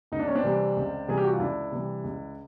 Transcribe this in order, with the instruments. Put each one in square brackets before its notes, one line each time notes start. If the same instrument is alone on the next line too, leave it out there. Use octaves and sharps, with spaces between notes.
[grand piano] C#2 D#4
D4
C#4
C4 D4
C3 E3 G3
C#2
C3 E3 G3 G#4
G4
F#4
F4
C#2 D4 E4
C3 E3 G3
C#2